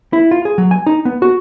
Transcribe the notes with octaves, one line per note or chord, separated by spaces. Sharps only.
E4
F4
G#4
F#3
G#5
D#4
B3
F#4